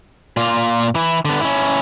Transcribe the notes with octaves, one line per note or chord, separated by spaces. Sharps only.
A#2 F4
E3 E4
D3 B3
C#4 E4